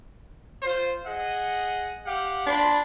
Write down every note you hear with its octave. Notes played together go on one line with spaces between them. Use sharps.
F4 C5
G#4 D#5 F#5
G4 F5 F#5
D4 B5 C6